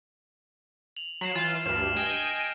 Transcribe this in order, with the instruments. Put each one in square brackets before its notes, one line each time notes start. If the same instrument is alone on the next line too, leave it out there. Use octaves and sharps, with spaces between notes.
[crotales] F7 F#7
[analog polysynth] F#3 [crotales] C7 E7 F#7
[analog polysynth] E3 F4
[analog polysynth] D2 G2 [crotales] F6 E7
[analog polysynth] D#5 G5 G#5